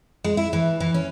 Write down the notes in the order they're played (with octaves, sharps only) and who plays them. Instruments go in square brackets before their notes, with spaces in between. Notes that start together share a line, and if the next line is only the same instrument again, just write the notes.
[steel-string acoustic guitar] G#3
E4
E3
E3
C#4